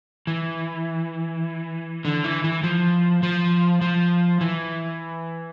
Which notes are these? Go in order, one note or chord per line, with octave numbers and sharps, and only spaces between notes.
E3
D3
E3
E3
F3
F3
F3
E3